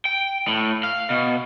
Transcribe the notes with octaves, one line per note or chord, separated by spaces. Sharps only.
G5
A2
F5
B2